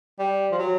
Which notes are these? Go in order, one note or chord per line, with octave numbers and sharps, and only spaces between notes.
G3
F3
F#3